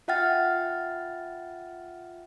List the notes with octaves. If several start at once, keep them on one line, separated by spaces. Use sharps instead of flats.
F4 E5 F#5 G5 F6 A6